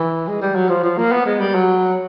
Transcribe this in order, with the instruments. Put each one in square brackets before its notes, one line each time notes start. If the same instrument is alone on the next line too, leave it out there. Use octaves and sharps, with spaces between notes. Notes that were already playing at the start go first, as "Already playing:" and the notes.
Already playing: [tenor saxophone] E3
G#3
G3
F#3
F3
F3
A#3
B3
G#3
G3
F#3